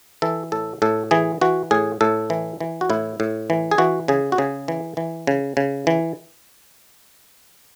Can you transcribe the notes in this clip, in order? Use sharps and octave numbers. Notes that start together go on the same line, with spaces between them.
E3 A4
A2 A4
A2 A4
E3 G#4
E3 F#4
A2 G#4
A2 A4
E3
E3
F#4
A2 E4
A2
E3
G#4
E3 F#4
C#3 G#4
F#4
C#3 G#4
E3
E3
C#3
C#3
E3